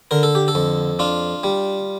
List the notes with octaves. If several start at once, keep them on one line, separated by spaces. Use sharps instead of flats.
D3 A#4
A4
G4
A4
F2
D4 F4
G3